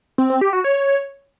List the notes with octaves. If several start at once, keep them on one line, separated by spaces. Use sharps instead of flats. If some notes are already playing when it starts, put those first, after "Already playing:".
C4
C4
G4
F#4
C#5